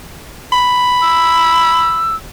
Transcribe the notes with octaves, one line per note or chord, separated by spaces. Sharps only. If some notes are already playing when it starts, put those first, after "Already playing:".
B5
E6